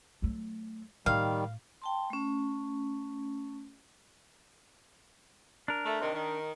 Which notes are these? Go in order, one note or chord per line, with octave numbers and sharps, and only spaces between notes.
F#3 A3
A2 D#3 G3 F5
G5 A5 C6
A3 C#4
D4 A#4
A3
C3 D#3
D#3